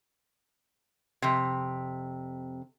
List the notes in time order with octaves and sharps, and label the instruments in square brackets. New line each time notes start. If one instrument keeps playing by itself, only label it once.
[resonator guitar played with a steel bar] F2 C3